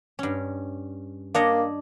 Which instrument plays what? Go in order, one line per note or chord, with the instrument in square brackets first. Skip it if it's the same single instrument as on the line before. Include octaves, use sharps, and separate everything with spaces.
[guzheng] G2 C#4
[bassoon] A#3 [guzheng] D4 C#5 D#5